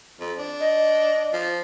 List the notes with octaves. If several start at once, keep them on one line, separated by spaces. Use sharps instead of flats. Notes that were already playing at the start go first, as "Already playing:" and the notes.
F2
D4
D#5
F3